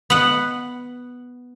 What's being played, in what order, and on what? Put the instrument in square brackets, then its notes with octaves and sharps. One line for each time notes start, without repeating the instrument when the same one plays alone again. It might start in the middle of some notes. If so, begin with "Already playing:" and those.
[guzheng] B3 F#5